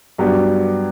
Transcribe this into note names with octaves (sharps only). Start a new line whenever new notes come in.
G2 F#3 B3 D4 G4